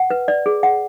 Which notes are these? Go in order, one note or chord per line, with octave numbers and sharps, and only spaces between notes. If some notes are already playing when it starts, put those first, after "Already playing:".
Already playing: F#5
B4
D5
G#4
F#5